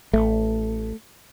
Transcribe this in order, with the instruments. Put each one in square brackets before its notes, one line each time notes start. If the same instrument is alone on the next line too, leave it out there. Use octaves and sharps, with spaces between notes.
[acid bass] A1 [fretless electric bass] A3